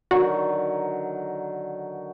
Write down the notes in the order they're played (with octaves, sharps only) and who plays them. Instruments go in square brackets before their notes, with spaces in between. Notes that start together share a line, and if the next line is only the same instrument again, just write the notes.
[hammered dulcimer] D3 D#3 F#3 [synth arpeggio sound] F#4